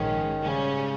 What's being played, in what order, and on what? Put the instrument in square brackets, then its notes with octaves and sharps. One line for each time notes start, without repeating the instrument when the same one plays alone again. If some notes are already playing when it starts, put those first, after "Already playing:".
Already playing: [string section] A#1 G#2 F3 G#3 C#4 [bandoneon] D#3
[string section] G#2 G3 C#4 [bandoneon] C#3